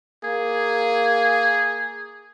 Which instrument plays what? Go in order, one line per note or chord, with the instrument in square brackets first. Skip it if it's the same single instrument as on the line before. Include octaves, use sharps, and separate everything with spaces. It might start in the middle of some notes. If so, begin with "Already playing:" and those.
[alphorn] A#3 [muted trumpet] G#4